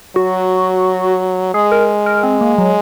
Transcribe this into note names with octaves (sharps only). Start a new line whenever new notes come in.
F#3 F#4
G#3 G#4
A#4
A#4
C4
A#3
F#3